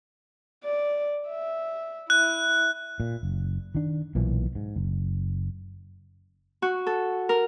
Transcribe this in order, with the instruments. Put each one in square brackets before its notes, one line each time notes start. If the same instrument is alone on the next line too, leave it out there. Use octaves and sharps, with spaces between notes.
[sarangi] D5
E5
[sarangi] E4 [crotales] F#6
[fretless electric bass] A#2
F#1
D#3 D4
B1 A#2 E3 F3
G#2
F#1
[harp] F#4
A4
A#4